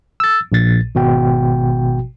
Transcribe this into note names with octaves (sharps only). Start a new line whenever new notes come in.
E6 A6
A#1 A#2 A6
G#1 B2 F#4 G5